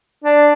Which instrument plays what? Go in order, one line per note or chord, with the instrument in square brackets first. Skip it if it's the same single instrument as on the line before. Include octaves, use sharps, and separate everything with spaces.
[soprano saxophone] D4